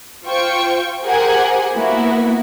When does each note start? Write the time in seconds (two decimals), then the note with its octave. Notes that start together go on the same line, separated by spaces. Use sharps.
0.25 F4 C5 G5 C#6
1.04 G4 G#4 A#4 C5 F#5 G#5
1.73 A#3 B3 E4 F#4